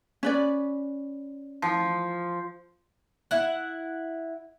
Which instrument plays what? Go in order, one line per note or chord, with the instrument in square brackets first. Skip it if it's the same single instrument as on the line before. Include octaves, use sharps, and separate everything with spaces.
[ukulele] C#4 B4 D5
[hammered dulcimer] F3
[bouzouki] E4 F#5